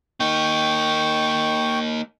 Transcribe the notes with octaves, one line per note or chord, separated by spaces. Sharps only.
A#3 D#4 G5 C#6